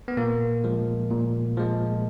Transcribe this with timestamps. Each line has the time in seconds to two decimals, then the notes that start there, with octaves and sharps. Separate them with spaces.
0.08 B3
0.17 A#2 A#3
0.64 F3 G#3
1.10 A#2
1.57 F3 G#3